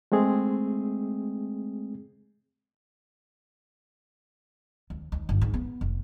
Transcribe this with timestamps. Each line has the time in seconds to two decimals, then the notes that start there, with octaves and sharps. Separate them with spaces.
0.12 G#3 A3 C4 G#4
4.90 D#2
5.12 D#2
5.29 G1
5.41 G#2
5.54 B3
5.81 F1